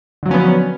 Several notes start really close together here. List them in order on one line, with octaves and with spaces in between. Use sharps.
D3 F#3 F3 C#4 B3